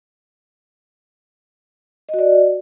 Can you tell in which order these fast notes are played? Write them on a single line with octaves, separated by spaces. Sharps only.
D#5 F#4 D5